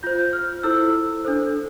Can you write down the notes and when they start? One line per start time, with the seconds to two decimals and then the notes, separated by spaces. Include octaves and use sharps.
0.03 F4 C5 G6
0.18 G6
0.33 F6
0.63 E4 A4 C5 E6
1.25 D4 A4 C5